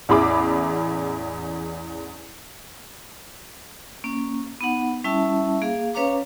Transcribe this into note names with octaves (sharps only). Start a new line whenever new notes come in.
A1 E2 E4 G#4 B5 D6
A#3 C#4
B3 D#4 F#5
G3 C#4 E4 E5 A5
A#3 G#4 F5
C#4 B4 C#5 F5 A#5 D6